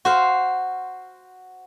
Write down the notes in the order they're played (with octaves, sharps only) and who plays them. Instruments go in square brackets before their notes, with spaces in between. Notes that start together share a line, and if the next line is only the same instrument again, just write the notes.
[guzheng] F#4 C5 F5